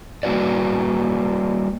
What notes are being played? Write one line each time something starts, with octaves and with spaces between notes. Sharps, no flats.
G3 A#3 F#4 B4 D5